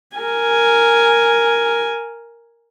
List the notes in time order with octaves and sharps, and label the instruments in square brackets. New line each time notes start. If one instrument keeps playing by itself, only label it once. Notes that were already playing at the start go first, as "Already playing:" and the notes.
[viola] A#4 G#5